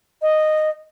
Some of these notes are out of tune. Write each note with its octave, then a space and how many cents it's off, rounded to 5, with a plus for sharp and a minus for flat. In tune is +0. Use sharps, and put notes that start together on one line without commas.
D#5 -10